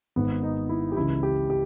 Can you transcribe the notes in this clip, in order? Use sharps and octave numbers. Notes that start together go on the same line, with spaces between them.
G#1 G#2 D#3 B3
D#4
E4
G4
C#2 C#3 E3 E4
G4
G4